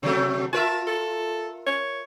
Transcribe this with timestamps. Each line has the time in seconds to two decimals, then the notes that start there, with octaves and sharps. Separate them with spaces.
0.03 C3 F#3 A3 C4
0.53 F4 A#4 E5 A5
0.87 A4
1.67 C#5